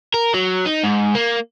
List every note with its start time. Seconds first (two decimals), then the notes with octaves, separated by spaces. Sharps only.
0.14 A#4
0.34 F#3
0.66 D#4
0.84 G#2
1.15 A#3